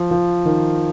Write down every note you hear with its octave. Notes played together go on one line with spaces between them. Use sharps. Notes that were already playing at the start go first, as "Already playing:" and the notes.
Already playing: F3
F3
D#3